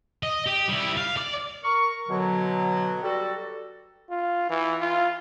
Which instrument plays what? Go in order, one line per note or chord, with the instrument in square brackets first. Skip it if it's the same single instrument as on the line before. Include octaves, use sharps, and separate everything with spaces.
[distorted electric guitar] D#5
G4
G3 E4
F5
D5
[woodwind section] A#4 C#6
B2 D3 F#3
G3 F#4 A4
[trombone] F4
E3
F4